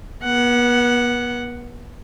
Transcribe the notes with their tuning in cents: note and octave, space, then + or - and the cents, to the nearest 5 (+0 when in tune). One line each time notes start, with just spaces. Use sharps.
B3 -40 F#5 +0